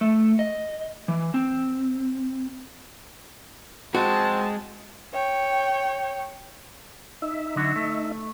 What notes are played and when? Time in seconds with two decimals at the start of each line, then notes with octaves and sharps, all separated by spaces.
0.01 A3
0.39 D#5
1.08 E3
1.34 C4
3.95 G#3 C4 F#4 A5
5.13 C#5 G5
7.22 D#4 E5
7.56 D3 F#3 F#4
7.76 A3